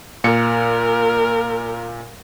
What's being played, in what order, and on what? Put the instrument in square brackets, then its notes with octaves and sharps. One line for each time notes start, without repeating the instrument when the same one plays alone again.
[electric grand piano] A#2 C#7 [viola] A#4